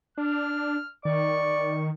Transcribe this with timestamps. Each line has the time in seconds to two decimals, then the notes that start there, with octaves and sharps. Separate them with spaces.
0.18 D4 F6
1.05 D#3 D5 C#6